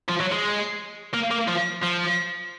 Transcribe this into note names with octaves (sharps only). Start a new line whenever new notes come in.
F3
F#3
G#3
A#3
A#3
F3
F3